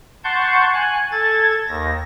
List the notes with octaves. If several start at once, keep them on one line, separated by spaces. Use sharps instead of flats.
F#5 A5 C6 C#6 G6
G#5 F#6
A4 G#6 A6
D#2 A#6